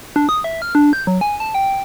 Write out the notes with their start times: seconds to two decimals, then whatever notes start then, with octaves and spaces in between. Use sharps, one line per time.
0.16 D4
0.29 D#6
0.44 E5
0.62 F6
0.75 D4
0.93 G6
1.07 F#3
1.21 G#5
1.40 A5
1.55 G5